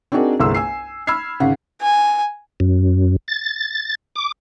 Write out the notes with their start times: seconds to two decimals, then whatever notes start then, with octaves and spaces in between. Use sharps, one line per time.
0.12 C4 D4 D#4 F#4 G#4 A#4
0.40 G1 C2 A3 G#4 C6 E6
0.54 G#5 E6 C7
1.07 B5 E6 F6 G#6 C7
1.40 G#1 C#3 F#5
1.82 G#5
2.60 F#2
3.28 A6
4.16 D6